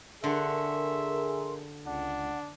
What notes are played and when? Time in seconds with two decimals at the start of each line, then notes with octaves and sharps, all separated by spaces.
0.24 D3 F#4 G#4 A#4 E5 C6
1.86 C#2 D4 F#5